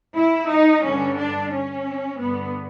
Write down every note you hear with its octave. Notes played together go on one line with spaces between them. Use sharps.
E4
D#4
G2 D3 C#4
D4
C#4
G2 D3 B3